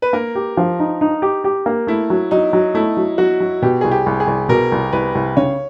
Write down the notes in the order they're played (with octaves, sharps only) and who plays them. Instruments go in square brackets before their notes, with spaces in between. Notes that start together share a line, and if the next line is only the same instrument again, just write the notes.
[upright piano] B4
[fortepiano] A#3 [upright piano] A#4
[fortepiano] G4
F3
D#4
D#4
G4
G4
A#3
[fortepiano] A3 [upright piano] E4
[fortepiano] F#3
[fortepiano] F#3 [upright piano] D#4
[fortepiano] F#3
[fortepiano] A3 [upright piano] E4
[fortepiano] F#3
[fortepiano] F#3 [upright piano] F#4
[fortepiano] F#3
[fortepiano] B2 [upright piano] G4
[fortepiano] C2 [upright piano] G#4
[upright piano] G4
[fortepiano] C2
[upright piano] G#4
[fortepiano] C2
[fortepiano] B2 [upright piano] A#4
[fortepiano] C2
[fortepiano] C2 [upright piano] B4
[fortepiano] C2
[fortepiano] C#3 [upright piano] C#5